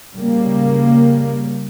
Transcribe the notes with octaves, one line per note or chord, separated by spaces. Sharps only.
C#3 G3 A#3